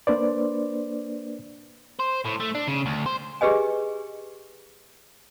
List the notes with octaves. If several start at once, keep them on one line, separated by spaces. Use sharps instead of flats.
A#3 D4 B4 C5 D5
C5
A2
A3
D4
C#3
D2
C5
G4 G#4 B4 D#5 G#5